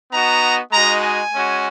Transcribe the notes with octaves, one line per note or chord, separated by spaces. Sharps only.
B3 D#4 F#4 A#5
G#3 D#4 F#4 A#5
G#5
G#3 C#4 F#4